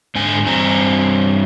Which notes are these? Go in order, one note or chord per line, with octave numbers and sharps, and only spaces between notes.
G#2 D3 G#5
G2 C4 G#5 A#5